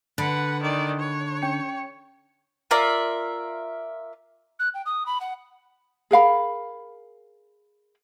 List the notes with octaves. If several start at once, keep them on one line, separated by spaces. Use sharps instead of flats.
D3 B4 F#5 B5 F#6
D#3 D5
C#5
C#4 G5 C#7
F4 A#4 D5 E5
F#6
G5
D#6
B5
F#5
G#4 A#4 F5 B5